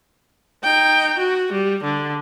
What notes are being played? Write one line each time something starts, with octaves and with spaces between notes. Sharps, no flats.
D#4 G5
F#4
G3
D3